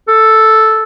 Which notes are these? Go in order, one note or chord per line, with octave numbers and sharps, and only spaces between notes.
A4